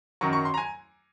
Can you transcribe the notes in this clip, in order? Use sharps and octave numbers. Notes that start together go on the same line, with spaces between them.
F#2 D#3 F#3 C#6
C#6
C6
A#5
G#5